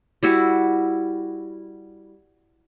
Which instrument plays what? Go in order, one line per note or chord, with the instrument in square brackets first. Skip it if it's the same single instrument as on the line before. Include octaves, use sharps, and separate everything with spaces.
[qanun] G3 E4 F#4